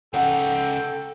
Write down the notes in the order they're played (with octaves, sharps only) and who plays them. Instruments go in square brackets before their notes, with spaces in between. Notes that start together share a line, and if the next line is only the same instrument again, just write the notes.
[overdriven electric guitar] C#3 D#4 [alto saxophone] A4 [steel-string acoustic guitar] F#5 [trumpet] G5